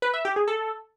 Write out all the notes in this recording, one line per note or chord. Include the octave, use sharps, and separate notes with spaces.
B4
E5
G4
G#4
A4